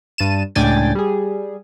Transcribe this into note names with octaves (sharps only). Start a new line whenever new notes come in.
G2 A5 D#7 E7
C#2 A2 D4 G5 G#5 A6
G3 G#4